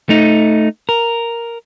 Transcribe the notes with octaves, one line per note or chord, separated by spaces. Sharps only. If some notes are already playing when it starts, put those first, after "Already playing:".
A3 D#4
A#4